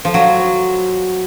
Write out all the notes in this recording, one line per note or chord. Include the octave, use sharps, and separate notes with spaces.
F3
F#3